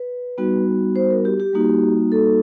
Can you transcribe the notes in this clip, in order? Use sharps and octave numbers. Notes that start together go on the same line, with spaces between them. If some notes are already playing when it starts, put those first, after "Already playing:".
Already playing: B4
G3 B3 D#4 F#4
C5
A#4
G4
G4
G3 A#3 D#4 F#4
A4